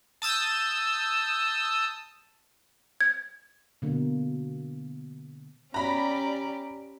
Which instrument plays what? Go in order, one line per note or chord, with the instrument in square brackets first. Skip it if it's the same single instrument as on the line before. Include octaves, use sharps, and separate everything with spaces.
[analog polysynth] A5 D#6 E6 G6
[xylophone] G#6
[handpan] B2 D3 A#3
[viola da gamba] C#4 G4 D5 [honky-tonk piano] A#5 B5